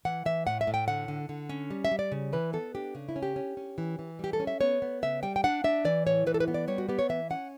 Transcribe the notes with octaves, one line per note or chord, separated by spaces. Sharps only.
E3 F#5
E3 E5
A2 F#5
E5
A2
G5
D3 F#5
D3
D3
C#4
G3
E5
G3
D5
C#3
E3 B4
B3 A4
D4 G4
C#3
E4
C#4
G4
C#4
C#4
E3
E3
G3 G4
A4
C#4
E5
B3 C#5
B3
C#3 E5
G3 G5
G5
D4 F#5
D4 E5
E3 D5
A2 C#5
E3 B4
A4
B4
B3
D5
G3 C#5
F#4
B3 G4
C#5
E3 E5
C#4 F#5